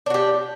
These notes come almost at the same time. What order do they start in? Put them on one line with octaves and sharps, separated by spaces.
D4 F#4 G4